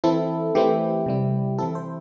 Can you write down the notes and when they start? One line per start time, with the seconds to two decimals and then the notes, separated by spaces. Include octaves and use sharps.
0.04 E3 C4 E4 A4
0.55 E3 A3 C4 E4 G4
1.06 C3 G3 E4
1.58 E3 C4 E4 A4
1.75 C5